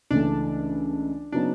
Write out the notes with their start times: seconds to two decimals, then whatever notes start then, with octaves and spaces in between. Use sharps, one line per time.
0.11 C#2 C#3 E3 A3 D4
1.32 C#3 F#3 B3 D4 D#4